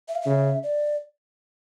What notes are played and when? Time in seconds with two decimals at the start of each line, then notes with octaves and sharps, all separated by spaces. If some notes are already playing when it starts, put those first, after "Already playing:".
0.08 E5
0.15 F5
0.22 C#3 E5
0.63 D5